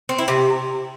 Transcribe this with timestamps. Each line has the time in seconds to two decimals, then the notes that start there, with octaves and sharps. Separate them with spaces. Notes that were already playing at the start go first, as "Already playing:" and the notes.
0.09 C4
0.18 E4
0.28 C3